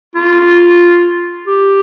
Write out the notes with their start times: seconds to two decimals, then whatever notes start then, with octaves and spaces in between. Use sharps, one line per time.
0.15 F4
1.47 G4